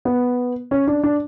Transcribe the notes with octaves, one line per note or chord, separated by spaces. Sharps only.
B3
C#4
D4
D4